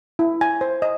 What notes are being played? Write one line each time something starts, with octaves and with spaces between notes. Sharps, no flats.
E4
G#5
C5
D#5